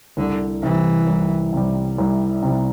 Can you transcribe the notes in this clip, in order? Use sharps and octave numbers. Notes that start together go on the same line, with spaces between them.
C2 D3
C3 E3 G3
C2
C3 G3
C2
C3 G3